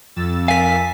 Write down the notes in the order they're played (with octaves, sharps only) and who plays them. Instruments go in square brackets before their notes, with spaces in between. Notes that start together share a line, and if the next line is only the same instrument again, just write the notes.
[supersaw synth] F2 E6 A6
[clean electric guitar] A#4 F5 [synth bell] G#5 B6